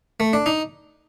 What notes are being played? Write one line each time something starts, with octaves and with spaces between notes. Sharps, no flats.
A3
D4
D#4